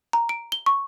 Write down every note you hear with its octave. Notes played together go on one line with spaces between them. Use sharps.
A#5
D7
G7
C#6